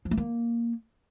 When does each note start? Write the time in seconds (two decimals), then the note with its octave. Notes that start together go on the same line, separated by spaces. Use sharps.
0.05 F3
0.11 A3
0.17 A#3